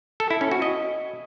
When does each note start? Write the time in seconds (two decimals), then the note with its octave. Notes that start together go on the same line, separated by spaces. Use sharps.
0.20 A4
0.30 E4
0.41 C#4
0.51 F#4
0.62 D#5